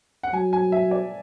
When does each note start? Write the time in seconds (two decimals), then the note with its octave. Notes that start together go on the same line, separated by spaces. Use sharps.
0.23 F#5
0.33 F#3 G#5
0.53 G#5
0.72 E5
0.91 D5